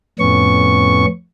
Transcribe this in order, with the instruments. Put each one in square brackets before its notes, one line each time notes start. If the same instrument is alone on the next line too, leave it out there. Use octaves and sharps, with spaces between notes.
[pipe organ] F2 A2 B3 C#4 C#6